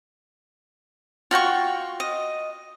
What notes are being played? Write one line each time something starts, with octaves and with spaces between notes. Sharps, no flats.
F4 F#4 G5 C#6
D#5